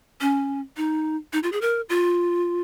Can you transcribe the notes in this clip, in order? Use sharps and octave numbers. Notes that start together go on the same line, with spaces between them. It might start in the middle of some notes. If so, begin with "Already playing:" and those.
C#4
D#4
D#4
F4
G#4
A#4
F4